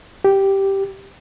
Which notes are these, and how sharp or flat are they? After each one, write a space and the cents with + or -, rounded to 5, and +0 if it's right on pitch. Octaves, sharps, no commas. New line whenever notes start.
G4 -5